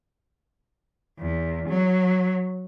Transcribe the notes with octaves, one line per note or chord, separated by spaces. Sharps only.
E2
F#3